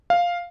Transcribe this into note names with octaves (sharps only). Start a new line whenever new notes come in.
F5